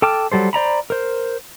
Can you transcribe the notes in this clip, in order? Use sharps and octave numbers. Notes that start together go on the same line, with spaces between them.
A4 G5 A5 D6 F6
F#3 G3 A4 C5
C5 D5 A#5 B5
A#4 C5